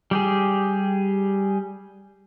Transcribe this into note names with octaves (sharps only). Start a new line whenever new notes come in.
G3 G4 G#4